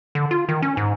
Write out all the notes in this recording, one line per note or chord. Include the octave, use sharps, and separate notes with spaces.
D3
F4
D#3
C#4
G#2